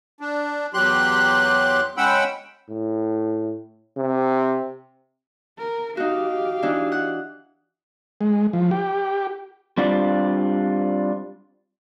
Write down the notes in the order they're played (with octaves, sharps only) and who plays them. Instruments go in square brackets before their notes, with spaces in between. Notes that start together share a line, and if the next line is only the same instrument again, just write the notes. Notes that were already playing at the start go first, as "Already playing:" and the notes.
[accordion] D4
E2 F#3 G4 C6 F#6
G#3 C#4 F#5 G5 B5 E6
[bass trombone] A2
C3
[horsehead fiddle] A#4
[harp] D#4 F#4 [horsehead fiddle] G4 F5
[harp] E3 D4 D#4
F#5
[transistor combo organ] G#3
F3
G4
[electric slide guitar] G3 C4 D4 F4